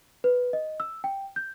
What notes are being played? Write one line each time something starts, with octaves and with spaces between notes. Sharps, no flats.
B4
D#5
E6
G5
G6